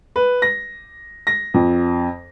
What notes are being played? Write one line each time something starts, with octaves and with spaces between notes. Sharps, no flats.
B4
A#6
A#6
F2